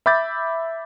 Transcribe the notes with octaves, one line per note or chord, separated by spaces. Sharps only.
E5 B5 D6 G6 A6